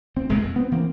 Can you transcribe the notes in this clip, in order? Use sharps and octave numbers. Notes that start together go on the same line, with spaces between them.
D2 C4
F1 A#2 G#3 A3
F2
B3 C4
E3 A#3 C4